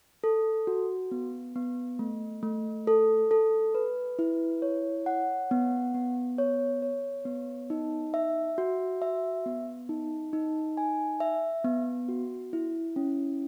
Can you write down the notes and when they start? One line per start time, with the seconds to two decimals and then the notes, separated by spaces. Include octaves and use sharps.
0.24 A4
0.67 F#4
1.11 B3
1.56 B3
1.99 A3
2.43 A3
2.87 A4
3.31 A4
3.75 B4
4.19 E4
4.62 C#5
5.06 F#5
5.51 B3
5.94 B3
6.38 C#5
6.82 C#5
7.25 B3
7.70 D#4
8.14 E5
8.58 F#4
9.02 E5
9.46 B3
9.89 D#4
10.33 D#4
10.77 G#5
11.20 E5
11.65 B3
12.08 F#4
12.53 E4
12.96 C#4